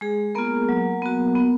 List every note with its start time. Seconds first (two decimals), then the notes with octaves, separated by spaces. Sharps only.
0.01 G#3 G#4
0.35 A#3 B3 F4 A#4
0.69 F#3
1.02 B3 F#4
1.35 B3